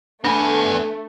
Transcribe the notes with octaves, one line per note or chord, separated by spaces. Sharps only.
A3 B3 D4 A4 G#5 B5